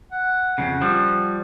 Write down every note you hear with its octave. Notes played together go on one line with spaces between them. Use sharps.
F#5
F2 A2 C#3
F3 G3